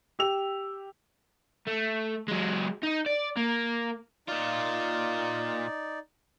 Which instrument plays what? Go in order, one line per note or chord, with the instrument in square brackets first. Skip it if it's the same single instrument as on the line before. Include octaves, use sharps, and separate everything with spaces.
[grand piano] G4 E6 F7
[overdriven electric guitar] A3
F#3 G#3
D#4
D5
A#3
[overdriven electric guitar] A#2 F4 [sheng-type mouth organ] D#4 D5